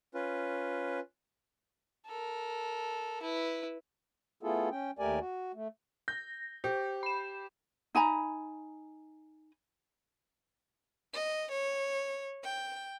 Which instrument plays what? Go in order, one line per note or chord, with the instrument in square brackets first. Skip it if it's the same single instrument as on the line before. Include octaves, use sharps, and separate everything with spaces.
[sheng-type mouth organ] C#4 F4 B4
[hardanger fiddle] A4 A#4
E4 B4
[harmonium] A3 B3 E4 F4 G#4 A4
C#4 G5
D#2 A3 G4 A#4 D5 G#5
F#4
A3
[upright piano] G6 [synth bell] A#6
[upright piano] G4 [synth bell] C5
[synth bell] B5 E7
[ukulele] D#4 G#5 A#5 B5
[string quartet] D#5
C#5
G5